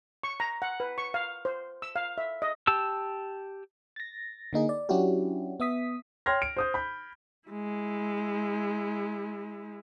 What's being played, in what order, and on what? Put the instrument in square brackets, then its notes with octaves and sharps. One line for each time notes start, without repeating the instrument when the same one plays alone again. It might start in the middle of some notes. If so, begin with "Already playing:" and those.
[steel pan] C#6
A#5
F#5
B4
C#6
F5
C5
E6
F5
E5
D#5
[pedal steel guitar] G4 A5 E6
[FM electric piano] A6 A#6
D3 A#3 D#4 G#4
D5
F#3 C#4 D4 E4 F#4 G4
B3 E5 D#6 B6
[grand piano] C#5 G5 C6 F6 G#6 A#6
D7
C5 D#6 G6
B5 G6
[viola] G#3 E4